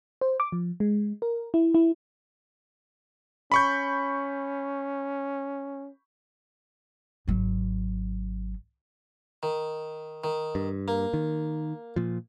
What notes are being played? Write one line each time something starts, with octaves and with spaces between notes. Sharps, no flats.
C5
D6
F3
G#3
A#4
E4
E4
C#4 B5 C#6 G6
G#1 F#3
D#3
D#3
G2
A#3
D#3
A#2 F3